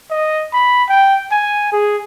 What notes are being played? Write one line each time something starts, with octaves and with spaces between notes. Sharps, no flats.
D#5
B5
G5
G#5
G#4